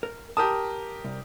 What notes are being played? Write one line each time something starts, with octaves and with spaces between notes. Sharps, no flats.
A#4
G4 A#4 A5 D#6
C2